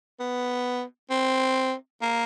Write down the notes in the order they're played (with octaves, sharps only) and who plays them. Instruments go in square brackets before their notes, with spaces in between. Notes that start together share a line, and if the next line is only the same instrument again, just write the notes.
[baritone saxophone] B3
C4
A#3